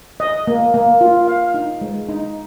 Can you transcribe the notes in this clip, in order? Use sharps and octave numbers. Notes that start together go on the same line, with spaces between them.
D#5
A#3
A#3
F4
F5
D#4
G#3
D#4